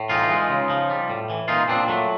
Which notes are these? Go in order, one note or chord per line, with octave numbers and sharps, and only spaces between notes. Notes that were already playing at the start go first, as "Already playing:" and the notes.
Already playing: A2
E3 D#4 F4
G#3
C#3
F3
G3
A2
E3
A#2 D#4 F4
A#2 C4 D4
F#3 A3